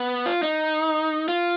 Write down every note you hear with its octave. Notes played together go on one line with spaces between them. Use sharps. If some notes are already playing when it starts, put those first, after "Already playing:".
Already playing: B3
F4
D#4
F4